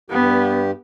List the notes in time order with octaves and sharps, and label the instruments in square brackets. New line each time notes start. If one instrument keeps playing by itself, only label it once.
[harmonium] G2 G4 [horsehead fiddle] B3